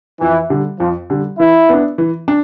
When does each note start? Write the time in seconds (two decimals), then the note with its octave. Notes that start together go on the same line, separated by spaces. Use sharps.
0.20 F2 E3
0.50 D3 G3
0.80 F2 F3
1.10 D3 G3
1.39 E3 E4
1.69 B3 D4
1.98 E3
2.28 D4